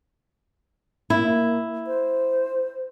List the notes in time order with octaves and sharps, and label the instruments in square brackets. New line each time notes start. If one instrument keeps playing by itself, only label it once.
[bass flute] A#3 [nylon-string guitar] E4
[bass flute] C5